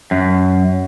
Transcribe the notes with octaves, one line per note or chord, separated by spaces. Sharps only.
F#2